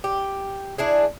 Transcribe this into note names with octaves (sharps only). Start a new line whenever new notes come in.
G4
D4 E4 G#4